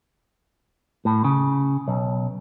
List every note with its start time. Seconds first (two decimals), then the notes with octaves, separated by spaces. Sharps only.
1.05 A2
1.24 C#3
1.88 B1